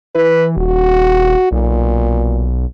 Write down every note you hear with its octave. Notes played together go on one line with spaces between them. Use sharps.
E3 B4
D#1 F#4
B1 A#2